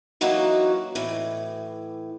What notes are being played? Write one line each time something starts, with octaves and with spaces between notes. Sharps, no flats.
E3 F#3 A#3 C#4 D#4 F#4
A2 E3